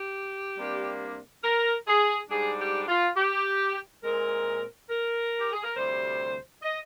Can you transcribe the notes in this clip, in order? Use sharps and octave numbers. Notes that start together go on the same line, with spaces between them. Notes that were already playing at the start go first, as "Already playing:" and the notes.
Already playing: G4
C3 G3 A#3 D4
A#4
G#4
G#2 G3 D4 G#4
G4
F4
G4
A#2 G#3 C4 A#4
A#4
G4
G#4
A#4
D2 C3 G3 C5
D#5